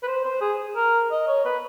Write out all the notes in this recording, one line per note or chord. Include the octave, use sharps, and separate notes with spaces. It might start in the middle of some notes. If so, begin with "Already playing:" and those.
B4
C5
C5
G#4
A#4
D#5
C#5
B4